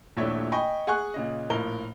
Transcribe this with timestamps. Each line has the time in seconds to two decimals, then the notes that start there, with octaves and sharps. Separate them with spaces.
0.17 D#1 A#1 A3 D4 E4 C#5
0.52 D#5 G5 G#5 B5 C#6
0.87 G#4 F#5 G#5 C#6 F#6
1.14 A#2 C#3 D#5
1.50 A#1 A2 F4 A#4 G7